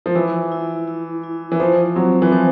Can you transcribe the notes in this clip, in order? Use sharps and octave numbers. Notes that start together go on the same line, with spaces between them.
F3
E3 E4
E4
E4
E4
E3
F3 C5
F#3 C4
E3
F3 C5